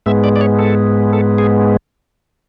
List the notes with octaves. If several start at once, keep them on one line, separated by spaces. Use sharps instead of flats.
G#2 G#3 B3 E5
D5
D5
C#5
A4
A4
G#4